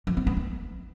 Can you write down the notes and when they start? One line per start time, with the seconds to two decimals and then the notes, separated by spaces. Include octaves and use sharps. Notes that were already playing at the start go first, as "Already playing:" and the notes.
0.07 F3
0.17 C4
0.27 B3
0.37 E4